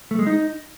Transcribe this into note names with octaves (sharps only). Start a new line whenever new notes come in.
A3
G#3
D#4